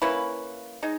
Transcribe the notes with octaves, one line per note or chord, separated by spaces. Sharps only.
A#3 C#4 E4 B4
G#3 D#4